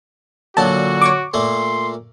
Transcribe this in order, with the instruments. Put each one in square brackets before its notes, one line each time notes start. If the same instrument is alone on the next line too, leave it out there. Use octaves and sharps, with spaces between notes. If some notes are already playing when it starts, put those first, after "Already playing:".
[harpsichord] A#2 D3 F#3 [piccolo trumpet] F#4 [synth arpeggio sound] A5
[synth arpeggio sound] C#5 C#6 D6
[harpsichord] A#2 A3 A#3 [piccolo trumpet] C6